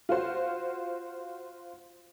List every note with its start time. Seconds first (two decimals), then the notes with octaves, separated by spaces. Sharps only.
0.09 F4 F#4 C5